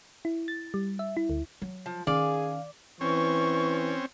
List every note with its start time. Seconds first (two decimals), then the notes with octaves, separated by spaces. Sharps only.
0.25 E4
0.48 A6
0.74 G3
0.99 E5
1.17 E4
1.30 D2
1.62 F#3
1.86 F3
2.07 D#3 C#4 G#4 D5 F5 G#5
3.01 E3 C4 C#4 C#6